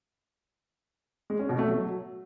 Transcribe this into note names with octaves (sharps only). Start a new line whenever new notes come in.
G#3
C#4
B2
A3
F#3